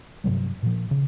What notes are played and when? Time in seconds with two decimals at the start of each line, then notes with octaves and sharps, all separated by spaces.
0.24 G2 C3 F#3 G3
0.63 A#2 F3
0.91 C#3